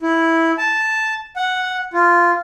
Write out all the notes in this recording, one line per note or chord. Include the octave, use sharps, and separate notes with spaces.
E4
A5
F#5
F4